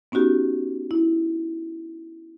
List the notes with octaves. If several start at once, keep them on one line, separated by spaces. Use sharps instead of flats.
B3 C#4 D#4 F#4 G4
E4